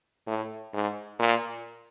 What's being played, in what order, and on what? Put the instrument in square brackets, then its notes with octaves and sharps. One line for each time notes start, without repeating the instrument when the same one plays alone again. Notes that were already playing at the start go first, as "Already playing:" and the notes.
[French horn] A2
G#2
A#2